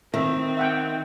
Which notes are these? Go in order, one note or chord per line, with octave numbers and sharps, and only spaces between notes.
D#3 C4 E5
E5 F#5 G5